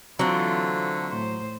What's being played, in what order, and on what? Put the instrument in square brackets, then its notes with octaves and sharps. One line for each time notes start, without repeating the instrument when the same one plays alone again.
[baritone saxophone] D3 [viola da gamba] E3 F4 [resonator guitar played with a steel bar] F#3 [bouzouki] A3 C4
[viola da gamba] A2 C5